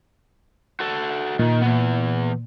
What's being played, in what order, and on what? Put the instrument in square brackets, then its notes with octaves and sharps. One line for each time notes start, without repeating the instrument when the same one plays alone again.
[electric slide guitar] F#4 A4
[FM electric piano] A#2 [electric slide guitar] D#3
[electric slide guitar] E3 B3